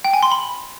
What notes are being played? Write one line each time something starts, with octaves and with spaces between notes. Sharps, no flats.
G5
G#5
C6
B5